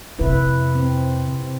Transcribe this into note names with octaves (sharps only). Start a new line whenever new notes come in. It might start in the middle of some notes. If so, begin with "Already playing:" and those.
F2 C3 E4 B4
C4
C3